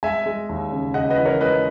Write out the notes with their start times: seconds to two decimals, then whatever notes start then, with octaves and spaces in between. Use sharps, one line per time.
0.03 G#3 E5 G#5
0.26 G#3
0.49 D#2
0.72 C#3
0.94 C#3 D#5 F#5
1.10 B4 D#5
1.18 E3
1.26 A#4 C#5
1.41 G#3 B4 D#5